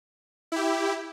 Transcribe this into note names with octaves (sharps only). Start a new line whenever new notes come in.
E4 G4